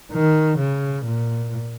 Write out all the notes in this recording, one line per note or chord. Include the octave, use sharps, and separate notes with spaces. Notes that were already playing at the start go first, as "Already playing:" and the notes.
D#3
C#3
A#2